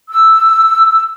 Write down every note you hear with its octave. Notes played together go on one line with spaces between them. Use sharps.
E6